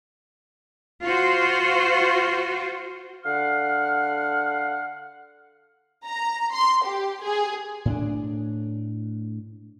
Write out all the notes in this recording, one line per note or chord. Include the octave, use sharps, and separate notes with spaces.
F4 F#4 C5
D3 F5 F#5 F6
A#5
C6
G4
G#4
A2 C#4 D4